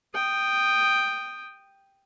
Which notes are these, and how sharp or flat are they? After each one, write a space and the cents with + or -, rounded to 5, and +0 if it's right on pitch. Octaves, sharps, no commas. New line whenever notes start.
G5 +0 D#6 -15